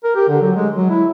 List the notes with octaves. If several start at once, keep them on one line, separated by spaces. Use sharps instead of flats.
A#4
G4
D3
F#3
G#3
F#3
E4